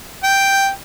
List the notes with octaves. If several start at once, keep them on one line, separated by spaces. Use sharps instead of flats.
G5